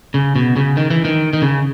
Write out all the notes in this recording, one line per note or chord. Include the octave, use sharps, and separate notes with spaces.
C#3
B2
C#3
D#3
E3
D#3
D#3
C#3